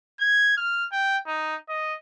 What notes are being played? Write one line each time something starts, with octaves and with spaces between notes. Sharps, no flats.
G#6
F6
G5
D#4
D#5